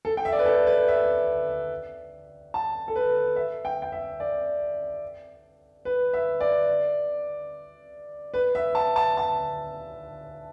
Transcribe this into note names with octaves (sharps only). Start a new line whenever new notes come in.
A4
G5
E5
D5
B4
A4
B4
E5
A5
A4
B4
E5
G5
G5
E5
D5
B4
E5
D5
B4
E5
A5
A5
A5